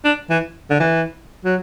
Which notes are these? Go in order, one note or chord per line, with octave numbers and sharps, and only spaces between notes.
D4
E3
D3
E3
F#3